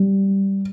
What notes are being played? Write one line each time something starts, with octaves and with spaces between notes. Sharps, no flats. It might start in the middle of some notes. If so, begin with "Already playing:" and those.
Already playing: G3